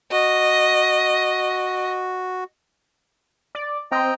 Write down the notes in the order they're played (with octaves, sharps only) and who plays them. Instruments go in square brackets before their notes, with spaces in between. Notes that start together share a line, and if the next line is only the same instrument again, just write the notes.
[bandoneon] F#4 [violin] D#5
[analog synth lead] D5
[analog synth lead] C4 [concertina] D#5 G5 A#5